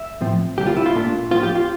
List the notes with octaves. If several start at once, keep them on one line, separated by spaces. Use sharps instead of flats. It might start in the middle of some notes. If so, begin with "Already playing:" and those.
Already playing: E5
A2 F3 C4
D2 C3 G3 A#3 G4
F4
E4
F4
A#2 A3 D4
A2 F3 C4 F4
G4
F4